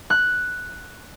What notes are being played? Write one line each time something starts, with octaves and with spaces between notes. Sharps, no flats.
F#6